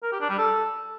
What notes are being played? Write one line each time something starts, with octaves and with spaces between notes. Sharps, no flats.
A#4
G4
D4
G3
A4